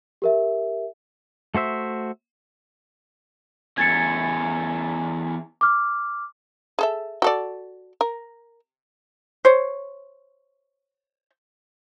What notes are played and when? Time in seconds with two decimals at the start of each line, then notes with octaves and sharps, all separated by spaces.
0.22 G4 A#4 E5
1.55 A3 F#4 C5 E5
3.78 E2 C#4 G#6 A6 C#7
5.61 D6 F6
6.79 G#4 A4 E5
7.22 F#4 A4 D5
8.01 A#4
9.45 C5 C#5